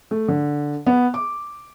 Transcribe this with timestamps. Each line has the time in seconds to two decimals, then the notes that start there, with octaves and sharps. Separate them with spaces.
0.11 A3
0.28 D3
0.86 B3
1.14 D6